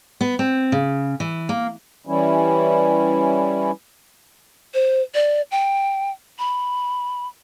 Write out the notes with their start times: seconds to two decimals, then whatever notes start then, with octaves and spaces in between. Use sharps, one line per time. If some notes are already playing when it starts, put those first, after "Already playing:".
0.21 B3
0.39 C4
0.72 C#3
1.20 E3
1.49 A#3
2.07 E3 G3 C#4 E4
4.74 C5
5.14 D5
5.51 G5
6.39 B5